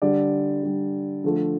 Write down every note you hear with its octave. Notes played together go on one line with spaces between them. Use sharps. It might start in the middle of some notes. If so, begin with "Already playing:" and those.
D3 G3 D5
D3 G3
D3 F3 A3